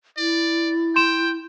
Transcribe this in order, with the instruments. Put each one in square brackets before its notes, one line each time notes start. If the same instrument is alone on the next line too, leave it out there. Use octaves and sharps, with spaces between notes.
[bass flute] E4 [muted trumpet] D5
[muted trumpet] G5 [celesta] C6 E7